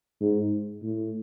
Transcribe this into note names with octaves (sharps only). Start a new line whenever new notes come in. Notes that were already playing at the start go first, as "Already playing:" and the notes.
G#2
A2